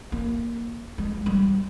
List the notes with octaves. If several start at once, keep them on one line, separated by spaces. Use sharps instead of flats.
A#3
G#3
G3